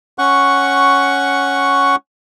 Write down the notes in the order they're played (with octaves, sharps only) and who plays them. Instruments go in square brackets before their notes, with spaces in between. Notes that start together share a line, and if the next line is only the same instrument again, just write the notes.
[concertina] C#4 F#5 C#6